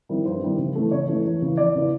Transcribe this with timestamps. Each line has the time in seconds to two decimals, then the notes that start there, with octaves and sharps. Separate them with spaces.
0.09 D#3 G3 C4 E4
0.25 G2 C5
0.42 D#3 G3 C4 E4
0.58 C#3
0.75 E3 A3 C#4
0.91 C#3 C#5
1.08 E3 A3 C#4
1.25 E2
1.42 C#3 E3
1.57 E2 D5
1.75 C#3 E3